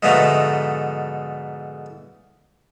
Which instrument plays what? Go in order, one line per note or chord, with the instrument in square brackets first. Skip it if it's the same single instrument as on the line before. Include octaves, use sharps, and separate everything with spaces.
[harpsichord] G#2 B2 D3 F3 A3 D#4